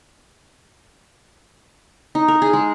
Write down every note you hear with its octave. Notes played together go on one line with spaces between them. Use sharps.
D#4
A#4
G#4
G#3